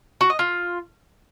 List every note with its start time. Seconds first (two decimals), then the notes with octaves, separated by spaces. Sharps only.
0.21 F#4
0.30 D#5
0.39 F4